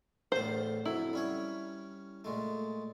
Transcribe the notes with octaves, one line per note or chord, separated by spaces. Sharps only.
E2 A2 C5 F5
F2 F#3 E4
G3 C#4 C#5
A#2 G#3 A3